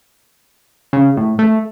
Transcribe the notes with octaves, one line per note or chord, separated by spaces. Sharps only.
C#3
A2
A3